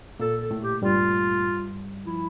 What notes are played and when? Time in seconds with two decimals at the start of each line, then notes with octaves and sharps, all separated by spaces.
0.20 A#2 A#3 A4
0.41 A4
0.51 A2 A3
0.62 G4
0.82 G2 G3 F4
2.06 F3 E4